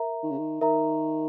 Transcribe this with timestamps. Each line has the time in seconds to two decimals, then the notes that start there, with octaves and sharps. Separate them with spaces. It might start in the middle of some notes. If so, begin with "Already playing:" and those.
Already playing: A#4 E5 A#5
0.23 D#3
0.30 C#3
0.38 D#3
0.61 D#3 A#4 E5 A#5